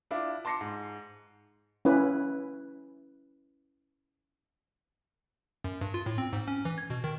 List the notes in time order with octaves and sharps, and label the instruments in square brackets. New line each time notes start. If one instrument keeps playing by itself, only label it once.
[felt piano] D4 E4 F4
A5 C6 D6 A#6 C7 C#7
G#2
[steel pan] C#4 E4 B4
[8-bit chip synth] F#2
G2
F4
A2
C4
G#2
C#4
E3
G#6
B2
D#3